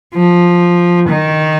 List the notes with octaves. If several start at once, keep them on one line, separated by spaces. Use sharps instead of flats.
F3
D#3